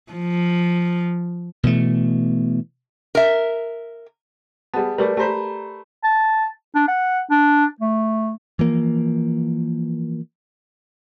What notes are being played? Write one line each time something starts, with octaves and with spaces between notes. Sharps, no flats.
F3
B2 E3 A3
A#4 E5
G3 B3 G#4 A5
G3 A3 A#4 B4 D5
A3 G4 C5 A#5 B5
A5
D4
F#5
D4
A3
E3 F3 A#3